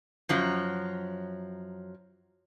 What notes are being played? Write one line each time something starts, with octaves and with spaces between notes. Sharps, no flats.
F#2 F3 F#3